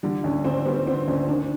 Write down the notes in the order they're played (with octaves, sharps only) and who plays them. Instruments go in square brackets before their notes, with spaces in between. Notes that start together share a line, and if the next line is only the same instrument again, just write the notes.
[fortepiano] D3 [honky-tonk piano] G3
[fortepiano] D2 [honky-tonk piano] C#4
[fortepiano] D2 [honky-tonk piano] C4
[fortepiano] G3 [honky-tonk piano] B3
[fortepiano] D3 [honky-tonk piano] C4
[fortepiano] D2 [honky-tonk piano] C#4
[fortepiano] D#3 [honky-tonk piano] D4